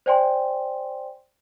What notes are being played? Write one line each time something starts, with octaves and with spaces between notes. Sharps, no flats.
C5 D5 G5 G#5 C6